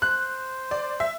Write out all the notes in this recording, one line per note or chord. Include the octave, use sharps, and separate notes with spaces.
C5 F#6
D5
C5
E5